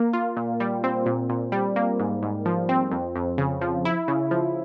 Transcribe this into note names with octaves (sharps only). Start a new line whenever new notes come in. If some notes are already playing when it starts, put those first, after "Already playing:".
Already playing: A#3
F4
A#2
G3
C4
A#2
A#2
G3
A#3
G#2
G#2
F3
C4
F2
F2
C#3
F3
E4
C#3
F3